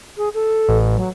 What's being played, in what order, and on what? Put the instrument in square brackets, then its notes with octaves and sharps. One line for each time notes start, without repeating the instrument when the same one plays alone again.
[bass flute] G#4
A4
[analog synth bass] A1
[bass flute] F#3